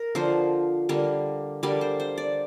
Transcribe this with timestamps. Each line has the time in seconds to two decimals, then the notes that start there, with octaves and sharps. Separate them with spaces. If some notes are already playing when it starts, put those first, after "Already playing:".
Already playing: A#4
0.15 D3 F3 A#3 C5
0.89 D3 G3 A#3
1.63 D3 G3 A#3 D5
1.81 C5
2.00 C5
2.18 D5